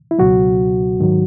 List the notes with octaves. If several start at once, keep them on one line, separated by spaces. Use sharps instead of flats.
E4
C#2 B2 F#3 F#4
G#2 D#3 F#3